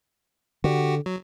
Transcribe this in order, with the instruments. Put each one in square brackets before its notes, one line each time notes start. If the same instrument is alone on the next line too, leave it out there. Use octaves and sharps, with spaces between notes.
[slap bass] D3 [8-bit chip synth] F#4 G4
[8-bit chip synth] F#3